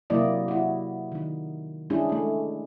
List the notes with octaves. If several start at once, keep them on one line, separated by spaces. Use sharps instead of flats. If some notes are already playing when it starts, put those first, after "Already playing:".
C3 F#3 A#3 E4 D5 D#5
E4 F#4
D#3 D#4
G#3 C#4 D4 E4 G#4
G#3 A3